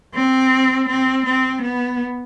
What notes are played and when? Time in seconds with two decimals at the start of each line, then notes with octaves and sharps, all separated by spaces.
0.14 C4
0.88 C4
1.25 C4
1.62 B3